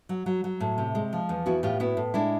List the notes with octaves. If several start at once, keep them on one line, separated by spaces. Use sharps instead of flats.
F#3
F#3
F#3
A2
C3
G#3
F3
E2
B3 E4 F#4
A2 F4 G4
B3 E4 F#4
A2
G#3 D4 E4